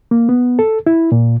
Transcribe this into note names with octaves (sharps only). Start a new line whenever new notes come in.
A#3
B3
A4
E4
A#2